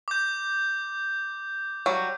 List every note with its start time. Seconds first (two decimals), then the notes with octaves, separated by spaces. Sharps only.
0.08 D6 G6
1.86 F#3 G3